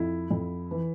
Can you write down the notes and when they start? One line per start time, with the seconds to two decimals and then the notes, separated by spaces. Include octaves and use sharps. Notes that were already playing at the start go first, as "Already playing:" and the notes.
Already playing: F2 E4
0.30 F2
0.71 E3